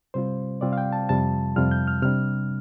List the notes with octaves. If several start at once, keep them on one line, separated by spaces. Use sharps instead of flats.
C3 G3 C4 F4 C5
C3 G3 C4 F4 D5
F5
G5
A5
F2 C3 G3 F4 A5
F2 C3 G3 F4 F6
G6
F6
C3 G3 D4 F6